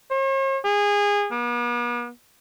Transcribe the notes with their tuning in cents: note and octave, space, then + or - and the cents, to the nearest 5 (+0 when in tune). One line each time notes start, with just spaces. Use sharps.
C#5 -45
G#4 -25
B3 -45